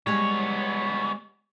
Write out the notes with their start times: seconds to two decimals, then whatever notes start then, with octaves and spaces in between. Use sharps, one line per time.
0.07 G3 G#3 B3 C#5